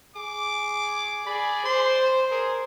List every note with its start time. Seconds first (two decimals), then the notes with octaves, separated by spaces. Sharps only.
0.16 G#4 D6
1.27 G#4 D5 B5
1.65 C5 C6
2.31 G#4 A#4